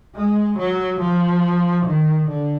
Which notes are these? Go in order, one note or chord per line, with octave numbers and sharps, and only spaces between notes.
G#3
F#3
F3
D#3
D3